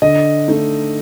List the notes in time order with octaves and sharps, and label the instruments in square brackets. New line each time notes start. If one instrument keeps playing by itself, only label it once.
[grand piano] D3 D#5
A3 D#4